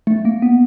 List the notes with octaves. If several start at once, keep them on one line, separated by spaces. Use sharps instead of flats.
A3
A#3
B3